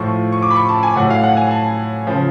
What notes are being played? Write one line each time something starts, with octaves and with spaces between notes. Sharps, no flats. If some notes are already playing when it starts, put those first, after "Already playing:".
Already playing: A2 F3 C#6
C#6
D6
B5
C#6
A5
G#5
A2 F#3 F#5
F5
F#5
G#5
A5
C#3 F3